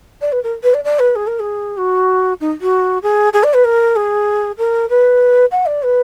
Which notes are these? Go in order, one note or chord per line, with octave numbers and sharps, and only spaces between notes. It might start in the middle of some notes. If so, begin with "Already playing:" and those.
D5
B4
A#4
B4
D5
D5
B4
G#4
A#4
G#4
F#4
D#4
F#4
G#4
G#4
D5
B4
A#4
G#4
A#4
B4
F#5
D5
B4